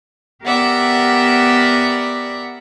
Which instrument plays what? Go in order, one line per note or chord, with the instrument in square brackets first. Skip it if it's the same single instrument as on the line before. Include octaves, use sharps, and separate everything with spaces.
[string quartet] B3 G4 A#4 D5 E5 F#5